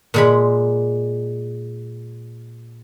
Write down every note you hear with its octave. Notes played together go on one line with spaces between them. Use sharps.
A#2 G#3 B5